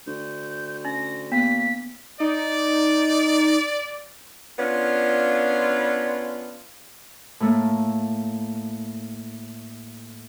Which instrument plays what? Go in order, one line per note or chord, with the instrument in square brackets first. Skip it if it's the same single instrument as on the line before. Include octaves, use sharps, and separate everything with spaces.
[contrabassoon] D2 [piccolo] G6
[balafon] C#4 [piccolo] A#6
[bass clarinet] A#3 [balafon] B3 [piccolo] B6
[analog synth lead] D#4 [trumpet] D5
[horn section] B3 C#4 D4 F4
[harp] A2 A3 A#3